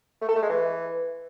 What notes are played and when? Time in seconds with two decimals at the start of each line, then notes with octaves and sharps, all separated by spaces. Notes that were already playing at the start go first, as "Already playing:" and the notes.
0.22 A3
0.29 A4
0.35 A3
0.42 G#3
0.49 E3